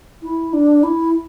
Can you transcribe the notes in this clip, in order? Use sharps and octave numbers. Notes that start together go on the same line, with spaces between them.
E4
D4
E4